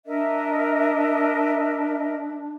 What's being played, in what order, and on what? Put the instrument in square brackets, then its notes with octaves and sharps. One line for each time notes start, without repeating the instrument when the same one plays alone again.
[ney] D4 [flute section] A#4 D#5 E5